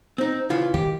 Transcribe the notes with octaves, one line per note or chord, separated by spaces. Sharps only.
C4 D#4
C#3 E3 F4
D#3 G4